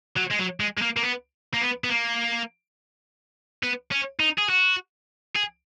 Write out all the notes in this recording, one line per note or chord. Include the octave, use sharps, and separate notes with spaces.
F#3
G#3
F#3
G#3
G#3
A#3
A#3
B3
A#3
B3
B3
A#3
B3
C#4
D#4
G#4
F#4
G#4